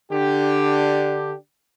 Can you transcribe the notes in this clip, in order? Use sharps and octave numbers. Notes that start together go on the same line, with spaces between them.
D3 D4 G4